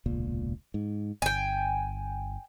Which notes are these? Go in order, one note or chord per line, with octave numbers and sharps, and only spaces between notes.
E1 C#2 A#2
G#2
G1 G5 G#5